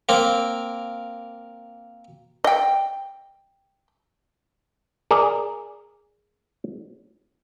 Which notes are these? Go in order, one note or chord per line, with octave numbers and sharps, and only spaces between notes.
A#3 C4
D#5 G5
G#4 A#4 D5 A#5